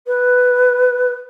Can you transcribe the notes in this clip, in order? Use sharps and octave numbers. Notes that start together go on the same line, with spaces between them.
B4